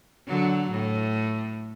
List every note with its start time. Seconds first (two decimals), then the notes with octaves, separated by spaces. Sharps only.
0.28 D3 F#3
0.72 A2